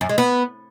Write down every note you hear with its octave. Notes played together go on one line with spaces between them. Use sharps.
F#2
G#3
B3